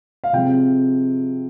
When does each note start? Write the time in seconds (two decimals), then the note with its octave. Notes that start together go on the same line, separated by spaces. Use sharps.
0.24 F5
0.33 C3 F3 G#3 C4 G5